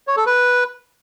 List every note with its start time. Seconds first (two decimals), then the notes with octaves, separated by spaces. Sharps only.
0.07 C#5
0.17 A4
0.26 B4